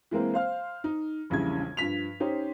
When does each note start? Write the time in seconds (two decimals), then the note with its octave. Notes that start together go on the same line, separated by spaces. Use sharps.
0.11 E3 G#3 A#3 C4
0.34 C5 F5 F6
0.84 D#4
1.30 E1 A#1 C#3 G3 E4 G#6
1.77 G2 F3 B6 F7
2.20 C#4 D#4 G4 C5